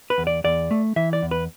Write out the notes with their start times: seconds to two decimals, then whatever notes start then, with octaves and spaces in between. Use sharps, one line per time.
0.10 B4
0.18 E2
0.27 D5
0.44 E2 D5
0.71 A3
0.96 E3 E5
1.13 D5
1.22 E2
1.31 B4